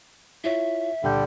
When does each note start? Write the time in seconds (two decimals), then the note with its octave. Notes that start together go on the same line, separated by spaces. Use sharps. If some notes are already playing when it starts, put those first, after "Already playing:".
0.44 E4 F4 C#5 E5
1.03 C#2 A#2 D3 G3 G6